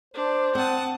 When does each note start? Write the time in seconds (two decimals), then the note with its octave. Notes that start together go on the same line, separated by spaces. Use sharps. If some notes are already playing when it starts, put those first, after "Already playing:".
0.14 D4 C5
0.55 C4 F#5 A5 D#6